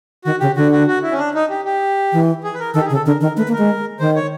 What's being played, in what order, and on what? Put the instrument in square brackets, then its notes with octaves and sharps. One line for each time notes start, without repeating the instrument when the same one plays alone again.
[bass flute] D#3 [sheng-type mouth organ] F#4
[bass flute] C#3 [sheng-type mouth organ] G4
[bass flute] D3 [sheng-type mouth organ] F#4
[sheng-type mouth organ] F#4
F#4
E4
C#4
D4
D#4
G4
G4
[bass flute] E3
[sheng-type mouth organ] G#4
B4
A#4
[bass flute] D#3 [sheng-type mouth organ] A4
[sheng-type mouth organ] G4
G#4
[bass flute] C#3
[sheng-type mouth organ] A4
[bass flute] D3 [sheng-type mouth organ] A#4
[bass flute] D#3 [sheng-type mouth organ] A#4
[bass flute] A3 [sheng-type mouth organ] B4
[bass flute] A#3
[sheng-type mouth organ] A#4
[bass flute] G#3
[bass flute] D#3 [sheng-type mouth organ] C5
[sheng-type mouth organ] C#5